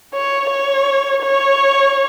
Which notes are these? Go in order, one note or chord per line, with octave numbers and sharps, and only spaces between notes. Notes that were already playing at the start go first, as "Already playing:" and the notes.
C#5
C#5
C#5